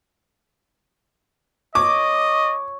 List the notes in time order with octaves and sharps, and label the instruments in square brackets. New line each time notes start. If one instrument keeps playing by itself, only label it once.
[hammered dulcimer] C#5 [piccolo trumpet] D#5 [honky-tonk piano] D6